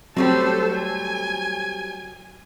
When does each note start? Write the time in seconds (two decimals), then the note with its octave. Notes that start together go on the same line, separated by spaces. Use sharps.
0.16 F#3 G3 A3 C4 A4 C5
0.75 G#5